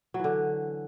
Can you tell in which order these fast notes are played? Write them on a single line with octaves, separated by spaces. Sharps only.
F#3 E3 D3